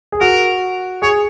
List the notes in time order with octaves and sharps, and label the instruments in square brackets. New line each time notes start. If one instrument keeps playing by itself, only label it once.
[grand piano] G#4
[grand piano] F#4 [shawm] A#4
[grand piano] G#4 [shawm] C#5